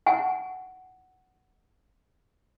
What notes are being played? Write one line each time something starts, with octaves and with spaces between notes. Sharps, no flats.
F#5 G#5